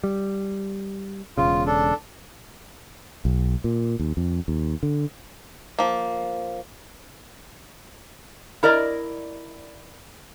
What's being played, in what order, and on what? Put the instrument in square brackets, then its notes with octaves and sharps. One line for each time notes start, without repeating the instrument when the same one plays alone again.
[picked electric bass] G3
[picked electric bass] E1 A#1 C#3 [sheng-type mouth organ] F4
[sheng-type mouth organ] D4 A4
[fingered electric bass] B1
A#2
D#2
F2
D#2
D3
[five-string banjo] F3 A#3
[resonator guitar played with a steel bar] E4 A#4 D5 D#5